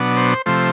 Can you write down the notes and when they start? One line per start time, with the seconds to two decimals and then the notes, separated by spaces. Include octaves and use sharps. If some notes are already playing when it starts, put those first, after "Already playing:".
Already playing: B2 F#3 B3 D4
0.17 C5
0.46 C3 F3 A3 C5